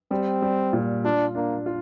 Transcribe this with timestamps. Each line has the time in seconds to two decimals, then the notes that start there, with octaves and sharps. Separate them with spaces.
0.11 G3 C4
0.42 G3
0.73 A#2
1.04 D4 F4
1.35 A#3 D4
1.66 F4